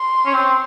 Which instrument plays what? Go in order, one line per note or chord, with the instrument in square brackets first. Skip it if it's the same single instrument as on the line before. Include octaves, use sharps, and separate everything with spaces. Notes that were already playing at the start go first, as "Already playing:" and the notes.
Already playing: [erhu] C6
[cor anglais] C#4
C4